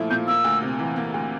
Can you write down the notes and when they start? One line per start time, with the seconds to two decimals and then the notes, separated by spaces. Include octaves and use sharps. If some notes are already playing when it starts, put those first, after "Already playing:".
Already playing: A#2 F3 A3 E4
0.10 A#2 G6
0.28 A#3 E6
0.44 D2
0.62 C3
0.79 E3
0.96 A#3
1.14 D2